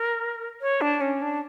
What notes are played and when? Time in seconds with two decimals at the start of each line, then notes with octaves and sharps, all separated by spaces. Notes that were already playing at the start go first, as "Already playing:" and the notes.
Already playing: A#4
0.61 C#5
0.81 D4
1.01 C#4
1.22 D4